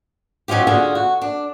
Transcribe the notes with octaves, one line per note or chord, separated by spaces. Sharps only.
F#3 C#4 D#4 F4 G4
D3 F4 F#4 G#4
F#4
D4